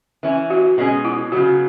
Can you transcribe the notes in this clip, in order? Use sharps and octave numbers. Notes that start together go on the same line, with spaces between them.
E3 C#4 E4
F#4
B2 G#3 C#4 G#4
E4
C#3 F#3 B3 F#4